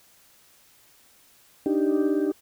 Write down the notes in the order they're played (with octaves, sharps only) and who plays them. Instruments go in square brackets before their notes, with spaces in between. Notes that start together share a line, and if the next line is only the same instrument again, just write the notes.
[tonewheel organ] D4 D#4 G4